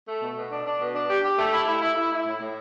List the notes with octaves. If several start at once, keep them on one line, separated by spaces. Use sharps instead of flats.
A3
B2
B2
D4
D4
B2
D4
G4
G4
A3
E4
E4
E4
E4
E4
A2
A2